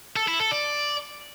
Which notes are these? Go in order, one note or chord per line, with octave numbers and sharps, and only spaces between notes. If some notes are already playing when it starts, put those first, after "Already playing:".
A4
E4
A4
D5